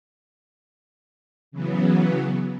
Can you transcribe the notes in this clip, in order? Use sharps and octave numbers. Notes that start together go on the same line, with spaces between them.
C#3 E3 F#3 B3